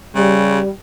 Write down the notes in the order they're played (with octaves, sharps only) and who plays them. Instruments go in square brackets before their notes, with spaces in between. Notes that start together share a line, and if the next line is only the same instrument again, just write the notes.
[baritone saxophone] C#3 [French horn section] G3